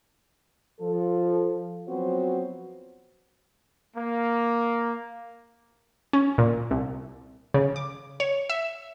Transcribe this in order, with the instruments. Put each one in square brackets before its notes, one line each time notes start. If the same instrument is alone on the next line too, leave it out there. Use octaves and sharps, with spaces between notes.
[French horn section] F3 A4
F3 F#3 B3 C4 F#4 C5
[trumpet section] A#3
[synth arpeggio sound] C#4
A#2
C2
C#3
D6
C#5
E5